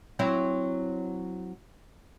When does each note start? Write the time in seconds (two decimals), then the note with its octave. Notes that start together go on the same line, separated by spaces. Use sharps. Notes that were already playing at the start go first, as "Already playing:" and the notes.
0.19 F#3 C4 E4